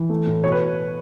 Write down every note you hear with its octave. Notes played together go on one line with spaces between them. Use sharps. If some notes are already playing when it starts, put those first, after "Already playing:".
Already playing: E3
A3
A2
B2 C#5
B4